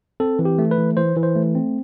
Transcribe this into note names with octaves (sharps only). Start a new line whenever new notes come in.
C4 A4
E3
G4
A3
B4
E3
E3 C5
E3
C5
A3
C4